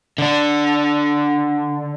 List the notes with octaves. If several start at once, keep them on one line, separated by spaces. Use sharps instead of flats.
D3 D4